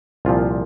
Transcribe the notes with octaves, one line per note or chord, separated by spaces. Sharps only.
C2 A#2 F3 F4